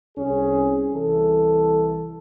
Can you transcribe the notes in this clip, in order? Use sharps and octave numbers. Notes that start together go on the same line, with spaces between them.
C2 C#4 G#4
C2 E3 A4